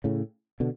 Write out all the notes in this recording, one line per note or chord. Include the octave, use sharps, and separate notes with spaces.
A2 C#3
B2 D3